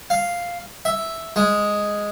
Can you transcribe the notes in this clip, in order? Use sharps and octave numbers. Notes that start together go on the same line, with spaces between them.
F5
E5
G#3